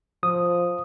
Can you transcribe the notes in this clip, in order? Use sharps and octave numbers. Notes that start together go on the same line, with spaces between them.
F3 D#6